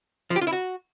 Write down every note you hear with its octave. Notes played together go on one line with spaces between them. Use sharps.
F3
G4
F4
E4
F#4